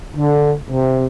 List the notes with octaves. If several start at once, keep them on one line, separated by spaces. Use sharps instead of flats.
D3
C3